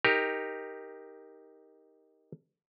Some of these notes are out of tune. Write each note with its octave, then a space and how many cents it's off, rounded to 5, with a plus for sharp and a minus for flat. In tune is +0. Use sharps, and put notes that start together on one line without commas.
D#4 +10 G4 +15 A#4 +0